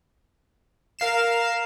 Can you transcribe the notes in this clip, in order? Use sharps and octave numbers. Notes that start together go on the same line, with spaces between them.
A#4 F5 C7 E7